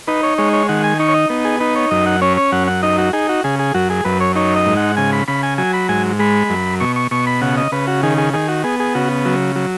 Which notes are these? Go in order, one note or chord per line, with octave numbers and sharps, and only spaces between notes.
D#4 B4
C#5
G#3 C#5
C#5
D#3 F#5
G#5
D#4 C#6
C#5
D#5
B3
G#4
D#4 B4
C#5
F#2 D#5
F#5
C#4 C#5
C#5
F#2 F#5
F#5
D#4 D#5
F#4
D#4 G#4
F#4
C#3 G#4
G#4
F#2 F#4
G#4
F#2 B4
C#5
D#4 C#5
D#5
G#2
F#5
C#3 G#5
B5
C#3 B5
G#5
F#3 G#5
B5
G#2 G#5
G#3 B5
F#2
B2 C#6
C#6
B2 C#6
B5
C#3 F#5
D#5
C#3 B4
F#4
D#3 G#4
G#4
D#3 G#4
F#4
B3 G#4
G#4
C#3 F#4
F#3
F#3